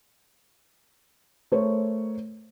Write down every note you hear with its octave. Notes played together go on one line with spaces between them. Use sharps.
A3 A#4 C5 C#5